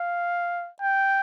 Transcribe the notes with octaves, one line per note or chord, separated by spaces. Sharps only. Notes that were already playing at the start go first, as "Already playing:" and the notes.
Already playing: F5
G5